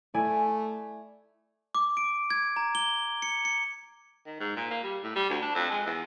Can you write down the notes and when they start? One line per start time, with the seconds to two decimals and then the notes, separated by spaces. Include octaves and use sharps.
0.14 A3 E4 D5 G#5
1.75 D6
1.97 D7
2.30 G#6
2.56 A#5
2.75 G7
3.22 C#7
3.45 C#7
4.26 D#3
4.40 G#2
4.56 A#2
4.71 A#3
4.83 G3
5.03 A2
5.16 G3
5.30 D2
5.42 D4
5.55 F2
5.71 G#3
5.86 E2